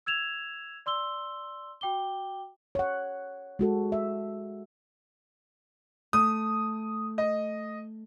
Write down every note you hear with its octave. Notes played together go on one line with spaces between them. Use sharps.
E6 G#6 E7 F7
D5 C6 E6 G7
F#4 G5 D6 G7
C#5 F#5
G#3 F#4 A4
E5
A3 D#6
D#5